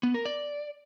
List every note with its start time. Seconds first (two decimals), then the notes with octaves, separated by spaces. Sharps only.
0.03 B3
0.14 A#4
0.26 D5